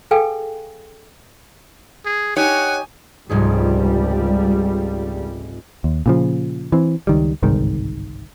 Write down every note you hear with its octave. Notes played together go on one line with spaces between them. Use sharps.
G#4 A4 B4 F5 G5 G#5
G#4
D#4 G4 C#5 F#5 G#5
F1 C#2 G#2 G3 G#4
D#2
A#2 C#3 F3
E3 C4
C#2 D#3 G3
G1 C2 G#2 D#3